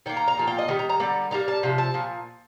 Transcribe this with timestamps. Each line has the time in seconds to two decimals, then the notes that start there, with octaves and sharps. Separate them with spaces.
0.06 D#3 A#3 G5
0.17 A#5
0.28 A#5
0.37 A#2 F3 A#3
0.47 G5
0.58 D#5
0.68 D#3 G3
0.79 A#5
0.89 A#5
1.00 D3 G3 A#3
1.31 D#3 G3 A#3 A#5
1.48 A5
1.63 C3 F3
1.78 A5
1.94 A#2 F3